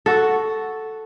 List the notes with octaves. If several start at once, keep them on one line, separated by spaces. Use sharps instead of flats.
F#4 A4